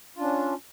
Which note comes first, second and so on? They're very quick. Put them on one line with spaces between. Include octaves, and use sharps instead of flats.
F4 D4 C#4